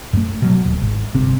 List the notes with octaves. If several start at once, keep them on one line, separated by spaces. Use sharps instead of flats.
F#2 A3
B2 F#3
D#1
G#1
G1 C3 C4